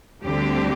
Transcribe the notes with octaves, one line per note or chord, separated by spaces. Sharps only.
D2 D3 G3 C4 G4